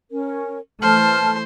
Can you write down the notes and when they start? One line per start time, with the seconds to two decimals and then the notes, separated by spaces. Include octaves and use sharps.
0.10 C#4 A#4
0.82 E3 A3 C5 A5 F6